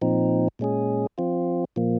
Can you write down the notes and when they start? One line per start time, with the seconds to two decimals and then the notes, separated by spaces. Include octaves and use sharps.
0.02 A#2 F3 C4 D#4
0.59 A#2 G#3 C#4 G#4
1.18 F3 C4 F4
1.76 A#2 F3 A#3